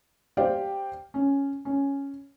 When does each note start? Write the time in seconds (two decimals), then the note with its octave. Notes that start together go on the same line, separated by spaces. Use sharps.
0.37 G4 C5 D5 F5 G5
1.14 C#4
1.65 C#4